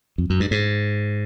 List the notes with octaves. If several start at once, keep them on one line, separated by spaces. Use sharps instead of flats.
F2
F#2
G2
G#2